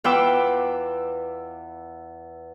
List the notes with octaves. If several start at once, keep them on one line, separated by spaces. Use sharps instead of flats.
E2 F4 B4 G5 D6 E6